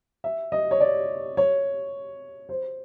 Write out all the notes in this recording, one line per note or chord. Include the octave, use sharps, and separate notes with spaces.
E5
D#5
C#5
D5
C#5
C5